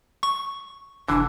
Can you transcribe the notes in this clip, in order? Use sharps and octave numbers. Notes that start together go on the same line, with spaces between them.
C#6
F1 D3 E3 D4